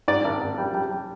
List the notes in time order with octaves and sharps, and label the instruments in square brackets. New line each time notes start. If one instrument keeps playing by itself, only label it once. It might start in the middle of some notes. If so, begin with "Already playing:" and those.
[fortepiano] G#2 D5
G#1
G#1
G3
G3
G3